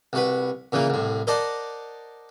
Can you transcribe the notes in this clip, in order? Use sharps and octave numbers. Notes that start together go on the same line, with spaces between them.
C2 F#4 B4
A#2 C#3 E3 A#3
C2 A2
A#4 C5 D5 D#5 F#5 A5